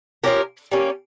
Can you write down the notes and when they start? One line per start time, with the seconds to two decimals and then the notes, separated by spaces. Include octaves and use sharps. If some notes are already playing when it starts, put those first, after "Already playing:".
0.24 F3 C#4 G4 A#4
0.71 G3 A#3 C#4